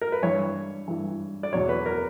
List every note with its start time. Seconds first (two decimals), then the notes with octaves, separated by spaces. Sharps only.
0.01 A#4
0.12 B4
0.23 G2 E3 C#5
0.88 G2 E3
1.43 D5
1.53 E2 B2 F#3 C#5
1.69 B4
1.86 A#4